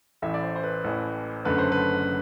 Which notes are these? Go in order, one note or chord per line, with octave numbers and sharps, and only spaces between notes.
A1 A2 E3 E5
D5
C5
C5
B4
A1 A2 E3
F#1 F#2 D3 A3 B4
C5
B4